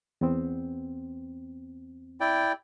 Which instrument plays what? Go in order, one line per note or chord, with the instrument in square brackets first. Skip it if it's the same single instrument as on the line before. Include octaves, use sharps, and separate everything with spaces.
[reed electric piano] E2 B3 C4
[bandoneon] E4 D5 G5